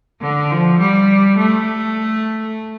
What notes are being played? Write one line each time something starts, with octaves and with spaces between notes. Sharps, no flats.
D3
F3
G3
A3